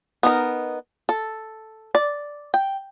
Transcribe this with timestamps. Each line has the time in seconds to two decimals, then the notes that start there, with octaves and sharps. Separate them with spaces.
0.23 B3 D#4 A#4
1.09 A4
1.95 D5
2.54 G5